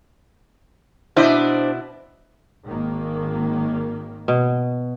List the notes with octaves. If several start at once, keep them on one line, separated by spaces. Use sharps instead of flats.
B2 D4 E4 C5 D#5
G#1 D#3 A#3
B2